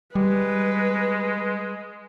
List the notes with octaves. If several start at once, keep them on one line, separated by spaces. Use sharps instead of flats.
G3 G#3 B4